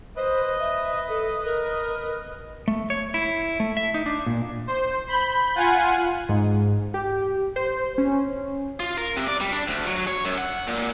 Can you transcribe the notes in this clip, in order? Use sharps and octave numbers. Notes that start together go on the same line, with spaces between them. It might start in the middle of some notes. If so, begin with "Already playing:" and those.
B4 C5 D#5
E5
A4
A#4
A3
C#5
E4
A3
E5
D#4
D4
A#2
C5
B5 G6
F4 F#5 G#5
G#2
G4
C5
C#4
F4
A#4
C3
D5
G3
D4
D2
F#3
C#5
F#2
F#5
A#2